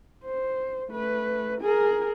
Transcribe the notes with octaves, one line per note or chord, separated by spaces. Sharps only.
C5
A3 B4
G#4 A#4